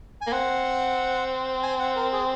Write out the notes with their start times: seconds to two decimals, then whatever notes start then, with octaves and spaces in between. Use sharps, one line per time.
0.21 G#5
0.27 A#3
0.32 C4 F#5
1.63 G#5
1.79 F#5
1.96 A#4
2.13 G#4